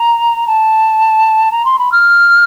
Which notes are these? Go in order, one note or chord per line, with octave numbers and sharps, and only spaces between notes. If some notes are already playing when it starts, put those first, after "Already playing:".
Already playing: A#5
A5
A#5
C6
B5
F6